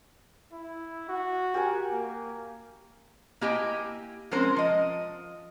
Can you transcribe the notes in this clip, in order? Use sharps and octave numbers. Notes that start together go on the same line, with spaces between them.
E4
F#4
G4 A#4 G#5
A#3
A#3 E4 G4 D#5 G#5
F3 G#3 C4 C#4 A#4 C5
F3 D#5